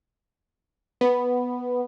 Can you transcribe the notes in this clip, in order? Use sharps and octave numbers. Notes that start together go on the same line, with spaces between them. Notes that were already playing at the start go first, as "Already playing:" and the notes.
B3